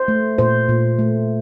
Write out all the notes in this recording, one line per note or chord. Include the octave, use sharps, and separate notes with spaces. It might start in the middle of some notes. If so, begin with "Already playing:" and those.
Already playing: C5
A3
A#2 C5
A#2
A3